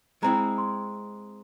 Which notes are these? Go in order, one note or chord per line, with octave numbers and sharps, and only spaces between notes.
G#3 C4 E4 A#5
C6